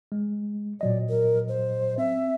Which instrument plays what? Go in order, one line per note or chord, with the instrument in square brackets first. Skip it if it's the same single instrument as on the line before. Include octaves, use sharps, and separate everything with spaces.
[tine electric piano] G#3
[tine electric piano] A#2 F#3 D#5 [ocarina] D5
[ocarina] A#4
C5
[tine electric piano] C4 [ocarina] E5